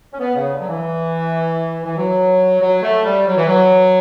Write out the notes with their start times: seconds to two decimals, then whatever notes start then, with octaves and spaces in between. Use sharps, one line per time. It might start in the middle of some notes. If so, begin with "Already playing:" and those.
0.13 C#4
0.19 B3
0.36 C#3
0.52 D3
0.61 F#3
0.68 E3
1.85 E3
1.97 F#3
2.61 F#3
2.83 A3
3.05 G3
3.27 F#3
3.37 E3
3.47 F#3